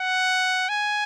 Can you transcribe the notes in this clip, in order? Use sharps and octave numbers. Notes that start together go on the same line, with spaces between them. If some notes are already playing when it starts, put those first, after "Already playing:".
Already playing: F#5
G#5